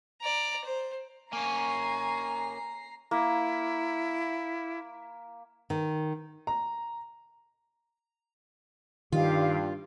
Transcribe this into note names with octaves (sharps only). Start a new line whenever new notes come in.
D5 A#5
C5
A#3 C#4 G#5 A#5 C#6 C7
A#3 E4
D#3
A#5
G2 D#3 F4 G4 F5